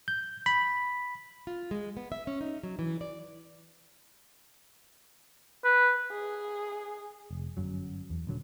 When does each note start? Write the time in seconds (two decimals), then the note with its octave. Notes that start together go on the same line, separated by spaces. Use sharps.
0.08 G6
0.46 B5
1.47 F4
1.71 G#3
1.97 B3
2.12 E5
2.27 C#4
2.41 D#4
2.64 F#3
2.79 E3
3.01 D5
5.64 B4
6.11 G#4
7.31 F1
7.57 G1 F#2 F#3
8.10 E2
8.27 D#1 D3 F#3